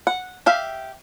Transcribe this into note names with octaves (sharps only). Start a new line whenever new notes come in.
F#5
G4 E5 F5